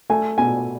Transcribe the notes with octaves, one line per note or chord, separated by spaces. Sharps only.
A3 G#5
B2 G#5